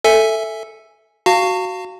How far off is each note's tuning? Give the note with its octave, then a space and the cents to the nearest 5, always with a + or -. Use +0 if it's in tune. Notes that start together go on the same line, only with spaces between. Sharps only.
A4 +5 E5 +0 G#5 +0
F#4 +5 F5 +0 A5 +40